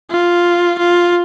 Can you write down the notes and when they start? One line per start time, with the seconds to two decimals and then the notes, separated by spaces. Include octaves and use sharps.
0.11 F4
0.78 F4